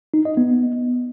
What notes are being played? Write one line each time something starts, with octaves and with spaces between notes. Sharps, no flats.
D#4
D#5
B3